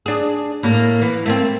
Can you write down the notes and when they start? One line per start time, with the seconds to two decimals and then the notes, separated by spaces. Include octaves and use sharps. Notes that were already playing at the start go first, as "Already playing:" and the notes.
0.06 D4 G#4
0.63 A2 A#3
1.02 E3
1.26 A3 A#3 C4